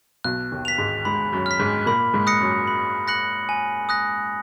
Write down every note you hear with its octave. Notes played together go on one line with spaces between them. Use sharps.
B1 B2 F#6
D#2 D#3
B6 F7
G#2 G#3
G#2 G#3 B5
F#2 F#3
F6 B6
G#2 G#3
A#2 A#3 B5
G#2 G#3
D#6 F#6 A#6 C#7
F#2 F#3
B5
F#6 A#6 C#7 F#7
G#5
D#6 F#6 A#6